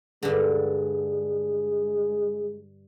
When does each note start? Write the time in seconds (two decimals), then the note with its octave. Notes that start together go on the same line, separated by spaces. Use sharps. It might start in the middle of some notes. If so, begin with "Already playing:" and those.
0.23 G2 D3 G#3